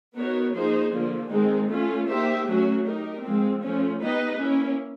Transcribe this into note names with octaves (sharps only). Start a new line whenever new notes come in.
B3 D#4 F#4 A#4 C#5
F3 A#3 D#4 G#4 C5
D3 F3 A#3
D#3 G#3 C4 D#4
A3 C#4 F4
A#3 D#4 G4 C5 E5
F#3 A3 C#4 F#4
D#4 G4 A#4
F3 G#3 C4
F3 A3 C#4
B3 D#4 G4 B4 D#5
A#3 C#4 E4